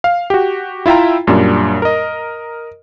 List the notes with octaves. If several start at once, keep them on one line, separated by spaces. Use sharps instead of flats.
F5
F#4 G4
E4 F4 E5 G5 A#5
F#2 A#2 G3 D4
A#4 D#5